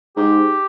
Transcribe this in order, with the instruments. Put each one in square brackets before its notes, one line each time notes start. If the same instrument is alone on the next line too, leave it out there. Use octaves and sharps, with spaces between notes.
[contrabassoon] G#2 [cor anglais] G4